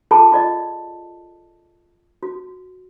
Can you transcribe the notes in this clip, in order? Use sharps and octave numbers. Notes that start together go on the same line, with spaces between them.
F4 G#4 A4 A5 B5
F4 D5 D#5
F#4